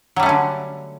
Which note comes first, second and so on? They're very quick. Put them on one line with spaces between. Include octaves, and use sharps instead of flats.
F#3 G3 A3 C#4 D3